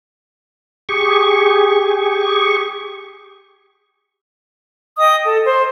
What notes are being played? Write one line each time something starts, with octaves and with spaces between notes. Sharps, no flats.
G4 G#4 C#6
D#5 G5 D#6
A4
C5